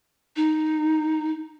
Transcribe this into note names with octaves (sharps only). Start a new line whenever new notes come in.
D#4